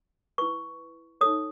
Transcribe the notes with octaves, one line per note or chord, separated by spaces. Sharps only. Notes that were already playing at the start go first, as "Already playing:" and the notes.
E4 B4 C#6
D#4 A4 C#5 D#6